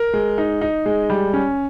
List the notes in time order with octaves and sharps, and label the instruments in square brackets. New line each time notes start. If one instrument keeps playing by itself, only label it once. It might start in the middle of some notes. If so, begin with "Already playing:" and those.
Already playing: [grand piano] A#4
G#3
D#4
D#4
G#3
G3
C#4